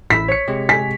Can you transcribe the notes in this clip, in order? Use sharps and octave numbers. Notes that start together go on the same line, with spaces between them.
A1 E4 E6 B6
C#5 C#7
C3 G#3 G4
G#5 B6